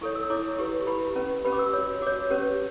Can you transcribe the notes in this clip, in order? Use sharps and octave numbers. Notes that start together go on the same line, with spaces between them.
E4 A4 C#5 C#6
E6
E4 A4 C#5 D6
E4 G4 B4 C#6
C#6
E4 G4 B4 B5
C#4 G4 B4
C#4 G4 B4 B5
D6
E6
F#4 C#5 E6
F#4 C#5 D6
C#4 G4 B4